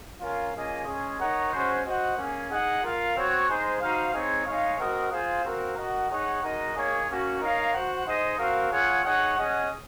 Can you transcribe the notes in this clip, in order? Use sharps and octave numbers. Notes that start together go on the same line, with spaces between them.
C#4 F4 A#4 F5
A#3 C#4 F4 G#4 D#5
G#3 C#4 G#4
D#4 A#4 C#5 F#5
G#3 C#4 F#4 C5
F#4 C5 D#5 F#5
A#3 C#4 G#4
D#4 G#4 D#5 F#5
F4 A#4 F5
C4 F#4 C#5 F#5
G#3 D#4 G#4 C5
D#4 F#4 C5 F5
G#3 C4 D#4 G#4 C#5
G#3 D#4 G#4 C#5 F5
C4 F#4 A#4 D#5 F#5
F4 G#4 C5 F5
C4 F#4 A#4 F5
F#4 A#4 D#5 F#5
D#4 G#4 C#5 F#5
G#3 D#4 F#4 A#4 D#5
A#3 D#4 G#4 C#5
A#3 C#4 F#4
D#4 A#4 C#5 F5
F#4 C5 F#5
D#4 G#4 C5 D#5
C4 F#4 A#4 F5
F4 G#4 C#5 F#5
D#4 G#4 C#5 F#5
C#4 G#4 D#5 F#5